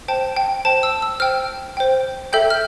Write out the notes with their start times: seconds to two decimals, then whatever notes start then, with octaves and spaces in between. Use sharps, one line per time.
0.08 C5 G5 A5
0.36 G5
0.65 C5 G5 A5
0.83 E6
1.02 E6
1.20 C5 G5 F6
1.77 C5 G5
2.33 A4 E5 G5 G6
2.50 F6